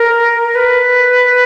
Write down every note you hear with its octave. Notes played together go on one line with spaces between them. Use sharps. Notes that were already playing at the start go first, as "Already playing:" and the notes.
Already playing: A#4
B4